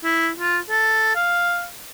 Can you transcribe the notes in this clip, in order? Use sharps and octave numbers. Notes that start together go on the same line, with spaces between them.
E4
F4
A4
F5